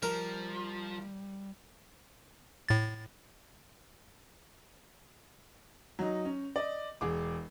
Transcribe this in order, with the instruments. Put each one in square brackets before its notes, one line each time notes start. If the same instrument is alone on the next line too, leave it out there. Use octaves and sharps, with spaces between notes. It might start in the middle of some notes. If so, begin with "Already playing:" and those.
[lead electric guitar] F3 [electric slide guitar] G3 [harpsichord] A#4
[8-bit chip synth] A2 A6
[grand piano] F#3 D#4
C#4
D5 D#5
E1 G#4 D6